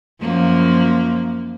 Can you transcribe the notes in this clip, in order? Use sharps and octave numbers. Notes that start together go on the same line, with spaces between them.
F#2 F3 A#3